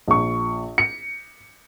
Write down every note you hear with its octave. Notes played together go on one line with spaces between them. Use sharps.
A#1 C#6
C#7